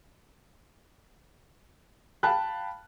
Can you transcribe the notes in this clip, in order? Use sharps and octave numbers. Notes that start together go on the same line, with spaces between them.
F5 G5 A5 B5 F#6